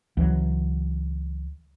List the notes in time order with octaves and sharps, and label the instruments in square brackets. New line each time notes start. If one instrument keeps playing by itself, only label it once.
[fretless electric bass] C#2 E3 F#3